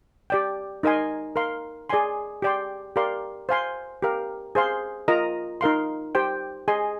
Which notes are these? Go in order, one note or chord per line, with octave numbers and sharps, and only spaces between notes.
G4 D5 G5
D#4 A#4 D#5 G#5 C6
A#4 F5 C6
G#4 D5 G#5 C6
G4 D5 G5 C6
G4 A#4 D5 F5 C6
C5 F5 G#5 C6
G4 A#4 F5
G#4 C5 F5 C6
F4 A#4 D#5 A#5
D#4 A#4 F5 C6
G4 C5 G5
G#4 D#5 G#5 C6